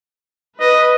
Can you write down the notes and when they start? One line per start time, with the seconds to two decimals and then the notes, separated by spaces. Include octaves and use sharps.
0.60 B4 D#5